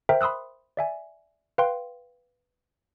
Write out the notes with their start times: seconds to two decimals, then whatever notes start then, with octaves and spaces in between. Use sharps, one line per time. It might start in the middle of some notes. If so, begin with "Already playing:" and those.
0.09 A#4 C5 E5 G5 A#5
0.21 B5 C6 D#6 E6 F#6
0.77 D5 E5 G#5
1.58 B4 F5 G5 C6